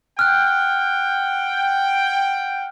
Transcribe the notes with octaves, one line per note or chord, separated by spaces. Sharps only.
F#5 G5 F6 F#6